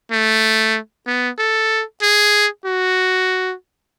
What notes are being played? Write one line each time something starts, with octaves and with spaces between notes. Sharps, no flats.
A3
B3
A4
G#4
F#4